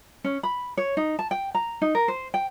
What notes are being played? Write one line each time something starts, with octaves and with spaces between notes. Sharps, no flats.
C#4
B5
C#5
D#4
A5
G5
A#5
D#4
A#4
C5
G5